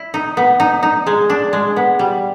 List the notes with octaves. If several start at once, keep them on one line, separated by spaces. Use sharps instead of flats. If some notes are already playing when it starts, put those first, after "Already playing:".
Already playing: E4
D#4
B3
D#4
D#4
G#3
D4
G#3
B3
G3